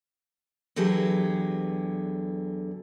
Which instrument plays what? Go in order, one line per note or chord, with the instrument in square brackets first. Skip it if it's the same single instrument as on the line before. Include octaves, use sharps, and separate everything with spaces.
[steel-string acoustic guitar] E2 D3 F#3 G4 G#4 B4